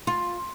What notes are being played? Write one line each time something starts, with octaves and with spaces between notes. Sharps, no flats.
F4